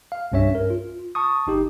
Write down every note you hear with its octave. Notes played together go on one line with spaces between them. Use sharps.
F5
C2 G2 C#4 C#5 E5
A#4
F4
A5 C#6 D#6
G1 D#4 G4